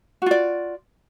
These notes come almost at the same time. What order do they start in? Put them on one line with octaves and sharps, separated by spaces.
F#4 F4 D5